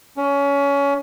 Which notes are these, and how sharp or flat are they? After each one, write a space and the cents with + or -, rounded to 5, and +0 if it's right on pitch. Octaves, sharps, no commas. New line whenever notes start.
C#4 +25